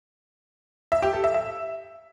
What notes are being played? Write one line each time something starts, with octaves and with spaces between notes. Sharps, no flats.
E5
G4
A4
E5
E5